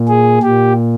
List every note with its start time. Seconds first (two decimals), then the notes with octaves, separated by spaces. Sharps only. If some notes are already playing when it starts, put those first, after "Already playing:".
Already playing: A#2
0.09 G#4
0.42 A#2 G4